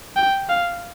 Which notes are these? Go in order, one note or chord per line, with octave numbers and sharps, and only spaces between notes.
G5
F5